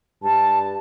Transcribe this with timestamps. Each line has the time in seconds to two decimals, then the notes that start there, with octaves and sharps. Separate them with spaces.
0.23 G2 A5